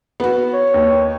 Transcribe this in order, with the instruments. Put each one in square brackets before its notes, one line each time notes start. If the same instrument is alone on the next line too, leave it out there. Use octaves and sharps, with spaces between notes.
[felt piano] B3 F#4
[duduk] C#5
[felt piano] D#2